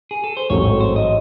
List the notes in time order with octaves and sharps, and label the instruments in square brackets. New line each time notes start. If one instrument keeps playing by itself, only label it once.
[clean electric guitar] G#4
A4
C5
[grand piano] A1 G#2 F#3 A3 C4 [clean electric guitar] C#5
[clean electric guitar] C5
D#5